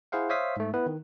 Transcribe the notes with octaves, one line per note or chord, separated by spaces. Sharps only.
E4 G#4 C5 F5 F#5
C5 C#5 E5 F5 D#6 B6
G#2 A3
B3 E4 B4
D#3